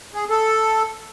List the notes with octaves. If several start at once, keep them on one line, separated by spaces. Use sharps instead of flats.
G#4
A4